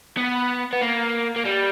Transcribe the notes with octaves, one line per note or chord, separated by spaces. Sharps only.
B3
B3
A#3
A#3
G3